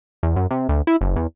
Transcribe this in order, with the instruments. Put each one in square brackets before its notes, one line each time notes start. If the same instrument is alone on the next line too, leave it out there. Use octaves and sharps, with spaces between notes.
[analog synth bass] E2
F#2
C3
D2
E4
F#1
E2